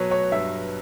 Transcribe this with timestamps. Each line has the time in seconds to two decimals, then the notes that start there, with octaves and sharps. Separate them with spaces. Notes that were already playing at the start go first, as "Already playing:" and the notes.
Already playing: B2 F#3 B4 C#5
0.11 C#5
0.32 G2 E5